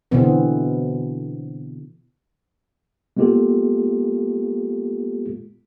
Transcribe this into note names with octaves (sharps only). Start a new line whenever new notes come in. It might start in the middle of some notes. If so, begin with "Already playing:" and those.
B2 D3 E3 B3 C4
G#3 A#3 B3 F4 G4 A4